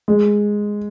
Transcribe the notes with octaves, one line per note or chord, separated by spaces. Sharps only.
G#3